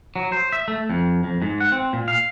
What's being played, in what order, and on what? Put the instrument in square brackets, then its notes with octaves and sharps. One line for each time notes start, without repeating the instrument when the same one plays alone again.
[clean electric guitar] F#3
C5
E5
A3
F2
F2
G#2
F#5
C4
A#2
F5